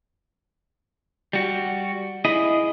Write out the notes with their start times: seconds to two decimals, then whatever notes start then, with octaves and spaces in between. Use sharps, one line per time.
1.33 G3 F#4
2.25 E4 G#4 D#5